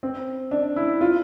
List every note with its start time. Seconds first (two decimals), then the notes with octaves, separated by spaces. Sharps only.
0.03 C4
0.51 D4
0.76 E4
1.01 F4